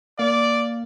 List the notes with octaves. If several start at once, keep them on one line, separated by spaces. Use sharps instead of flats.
A#3 D5 F5